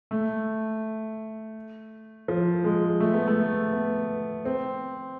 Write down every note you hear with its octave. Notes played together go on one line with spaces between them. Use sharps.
A3
F3
G#3
A3
B3
A3
B3
C4